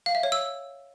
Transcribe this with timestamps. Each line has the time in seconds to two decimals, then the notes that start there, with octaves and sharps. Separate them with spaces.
0.06 F5
0.15 E5
0.23 C#5
0.32 E6